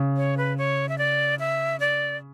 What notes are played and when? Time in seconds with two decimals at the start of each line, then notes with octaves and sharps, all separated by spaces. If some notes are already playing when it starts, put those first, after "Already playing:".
Already playing: C#3
0.17 C#5
0.37 B4
0.58 C#5
0.89 E5
0.98 D5
1.39 E5
1.80 D5